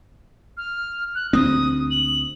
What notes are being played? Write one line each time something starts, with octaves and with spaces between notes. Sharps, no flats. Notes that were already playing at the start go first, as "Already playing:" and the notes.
F6
F#6
D2 B3 C4 D#6
F#7